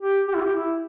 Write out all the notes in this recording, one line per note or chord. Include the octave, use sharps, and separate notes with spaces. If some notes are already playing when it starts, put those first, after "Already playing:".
G4
G4
E4
G4
E4